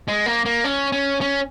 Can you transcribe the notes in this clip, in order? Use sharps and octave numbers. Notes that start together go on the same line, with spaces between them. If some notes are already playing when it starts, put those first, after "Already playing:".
G#3
A#3
A#3
C#4
C#4
C#4